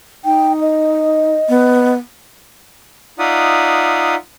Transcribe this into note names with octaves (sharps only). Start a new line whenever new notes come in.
D#4 G5
D#5
B3
D#4 F4 D5 E5 F#5 D#6